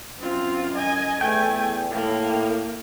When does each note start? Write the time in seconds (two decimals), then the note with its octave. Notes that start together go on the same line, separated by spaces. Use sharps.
0.19 F#2 C4 F4
0.74 D#5 G#5
1.21 E2 A3 G5 G#5
1.91 A2 A#3